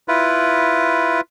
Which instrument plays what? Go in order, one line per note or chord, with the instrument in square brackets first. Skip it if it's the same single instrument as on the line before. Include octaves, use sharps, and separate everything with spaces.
[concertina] E4 F4 B4